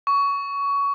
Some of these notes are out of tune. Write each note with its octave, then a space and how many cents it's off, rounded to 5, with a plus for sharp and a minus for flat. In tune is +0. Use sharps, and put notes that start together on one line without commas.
C#6 +20